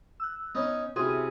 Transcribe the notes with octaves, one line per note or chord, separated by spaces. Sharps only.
E6 F#6
B3 C#4 D#4
C3 C#4 E4 F#4 G#4 C6 D#7